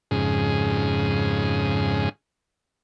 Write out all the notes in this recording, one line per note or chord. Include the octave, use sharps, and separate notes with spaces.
F2 G#2 C#3 G#4